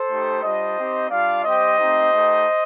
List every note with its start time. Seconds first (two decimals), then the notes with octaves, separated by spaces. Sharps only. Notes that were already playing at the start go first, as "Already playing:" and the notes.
Already playing: A4 C5
0.09 A3 D#4 G4
0.43 G3 D4 F4 C5 D#5
0.77 C4 D#4 G4
1.10 G3 D4 F4 D5 F5
1.44 G3 C4 G4 C5 D#5
1.78 A3 C4 D#4 G4
2.12 A3 D#4 G4